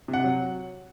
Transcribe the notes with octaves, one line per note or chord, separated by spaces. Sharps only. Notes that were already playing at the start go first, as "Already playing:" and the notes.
C3
F#5
F#3